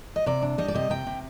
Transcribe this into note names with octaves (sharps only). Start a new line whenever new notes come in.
D#5
C3 D5
D4
G3 D#5
D5
C3 D#5
C3 G5
C3